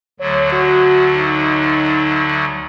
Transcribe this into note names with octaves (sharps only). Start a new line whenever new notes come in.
D2 D3 F#3 C#5
F#4
D#4